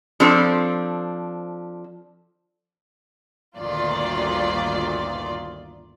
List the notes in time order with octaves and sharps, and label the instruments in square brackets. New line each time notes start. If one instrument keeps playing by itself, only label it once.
[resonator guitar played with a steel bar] F3 C4 D4 A4
[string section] G1 D2 A#2 D#3 F4 D5